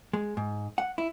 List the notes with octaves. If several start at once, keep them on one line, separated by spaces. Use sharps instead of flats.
G#3
G#2
F#5
E4